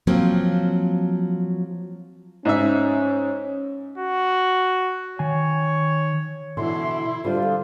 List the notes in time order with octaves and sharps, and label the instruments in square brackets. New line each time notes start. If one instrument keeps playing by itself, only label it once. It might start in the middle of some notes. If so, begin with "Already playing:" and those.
[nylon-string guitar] F3 F#3 A#3 C4
[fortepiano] G#2 D#4 E5 [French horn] C#4
[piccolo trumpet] F#4
[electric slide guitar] D#3 G#5 [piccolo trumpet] C#5
[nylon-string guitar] B2 D3 E3 [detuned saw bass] E4 [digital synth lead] C6
[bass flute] E5
[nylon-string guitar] D3 G3 [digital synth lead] F4 [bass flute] C5
[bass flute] A4